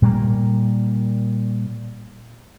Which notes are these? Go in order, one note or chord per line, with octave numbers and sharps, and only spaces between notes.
A#2 G3 G#3 A#3